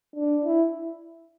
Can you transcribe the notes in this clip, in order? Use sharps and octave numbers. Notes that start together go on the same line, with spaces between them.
D4
E4